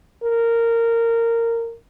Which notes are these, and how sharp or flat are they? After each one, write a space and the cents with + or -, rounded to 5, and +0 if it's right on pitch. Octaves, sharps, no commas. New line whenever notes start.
A#4 -15